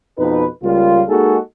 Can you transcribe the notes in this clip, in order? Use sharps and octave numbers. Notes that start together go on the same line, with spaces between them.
F2 B2 D#4 B4
C#2 G3 A#3 F4
G#3 A#3 D#4 F#4 G#4 A4